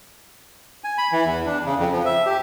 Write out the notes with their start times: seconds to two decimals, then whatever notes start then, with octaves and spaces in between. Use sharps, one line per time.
0.84 G#5
0.98 B5
1.12 E3
1.25 E2
1.46 D4
1.66 C#3
1.78 F2
1.92 F3
2.05 E5
2.26 G4